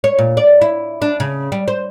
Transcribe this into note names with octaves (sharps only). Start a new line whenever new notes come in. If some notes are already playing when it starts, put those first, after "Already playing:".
C#5
A#2
D5
E4
D4
C#3
G3
C5